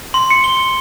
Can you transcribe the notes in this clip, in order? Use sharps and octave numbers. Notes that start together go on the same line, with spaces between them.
C6
C#7
G7